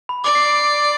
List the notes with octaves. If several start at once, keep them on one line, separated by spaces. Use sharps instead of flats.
B5
D5 D6
C7
D7